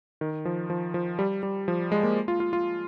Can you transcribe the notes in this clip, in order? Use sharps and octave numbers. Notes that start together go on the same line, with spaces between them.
D#3
F3
F3
F3
G3
G3
F3
G#3
A#3
F4
F4
F4